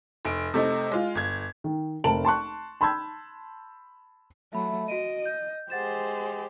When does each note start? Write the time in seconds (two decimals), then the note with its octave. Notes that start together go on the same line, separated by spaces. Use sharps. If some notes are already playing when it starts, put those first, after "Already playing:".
0.25 F1 D7
0.54 C3 A3 D#4
0.92 G#3 F4
1.15 G1 G#6
1.64 D#3
2.04 F1 C4 A#4 A5 D7 F#7
2.25 A5 C6 C#6 F#6
2.81 A5 B5 C6 E6 G6 G#6
4.53 F#3 A3 E5 B5
4.88 F#4 D#5 D7 D#7
5.26 G6
5.70 G#3 G4 C5 F#5 A6 E7